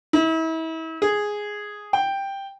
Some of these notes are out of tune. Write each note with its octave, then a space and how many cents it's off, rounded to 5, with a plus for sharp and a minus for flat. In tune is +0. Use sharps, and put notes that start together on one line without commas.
E4 -35
G#4 +0
G5 +5